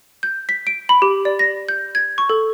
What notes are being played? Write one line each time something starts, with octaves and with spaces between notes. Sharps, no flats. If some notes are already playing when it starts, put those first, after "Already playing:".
G6
B6
D7
B5
G4
D5
A#6
G6
G#6
C#6
A4